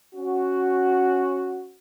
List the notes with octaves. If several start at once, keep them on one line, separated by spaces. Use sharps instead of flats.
C#4 F#4